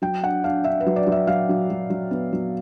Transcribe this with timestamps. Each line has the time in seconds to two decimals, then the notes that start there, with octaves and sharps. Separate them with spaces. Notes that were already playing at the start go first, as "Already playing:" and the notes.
0.02 F#3 G5
0.23 D4 F#5
0.44 D4 F5
0.64 D4 E5
0.80 B4
0.86 F#3
0.96 D5
1.07 F#3
1.12 E5
1.27 F#3 F5
1.49 F#3
1.70 F#3
1.90 F#3
2.11 B3
2.33 F#3